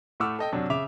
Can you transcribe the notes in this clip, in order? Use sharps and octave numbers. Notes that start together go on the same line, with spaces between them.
A2 A3 F#5 D6 E6 F6
A4 D#5 G5
F#2 C3 F#3 D4
C#3 E5 D6 F7